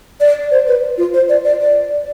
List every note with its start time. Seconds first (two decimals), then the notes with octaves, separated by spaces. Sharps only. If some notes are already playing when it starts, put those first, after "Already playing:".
0.20 D5
0.51 C5
0.67 B4
0.98 F4
1.14 C5
1.29 D5
1.45 D5
1.61 D5